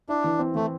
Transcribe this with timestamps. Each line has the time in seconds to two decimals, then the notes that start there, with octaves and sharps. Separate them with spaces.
0.09 D4 E4
0.24 E3
0.39 C4
0.55 E3 A3